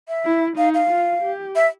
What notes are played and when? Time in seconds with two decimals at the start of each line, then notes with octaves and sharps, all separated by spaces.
0.08 E5
0.25 E4
0.57 D#4 F5
0.74 F5
0.90 F4
1.23 G4
1.56 E5